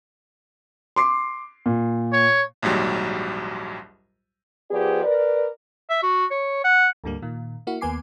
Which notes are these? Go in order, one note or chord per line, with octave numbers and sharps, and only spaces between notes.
C6 D6 C7
A#2
C#5
A#1 D#2 G#2 F#3 G3
F3 B3 G4 G#4 D5
A#4 B4 D5
E5
F#4
C#5
F#5
D2 G#2 D3 G3 A#3
A#2 D#3
A#3 E4 F#4
D#2 A#3 B3 G#5 D6 C7